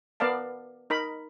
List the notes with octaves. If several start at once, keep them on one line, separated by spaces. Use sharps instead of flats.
B3 A#4 D5 F5 A5
D#4 A#4 B5